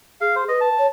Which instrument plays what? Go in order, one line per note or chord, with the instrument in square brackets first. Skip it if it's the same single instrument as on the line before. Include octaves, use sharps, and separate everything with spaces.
[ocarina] G#4 [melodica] F5
[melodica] C5
[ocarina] B4 [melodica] D#5
[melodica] A5
[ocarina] C#5